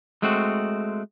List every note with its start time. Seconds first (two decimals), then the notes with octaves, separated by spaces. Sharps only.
0.22 G#3 A3 C4 F#4